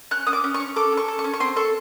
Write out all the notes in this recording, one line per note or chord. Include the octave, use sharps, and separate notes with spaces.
C#4 F#6
C#4 D#6
D6
C#4
C#6
C#4
A4 D6
C#4
C#6
A4
C#6
C#4
C#6
C4 C6
A4 C#6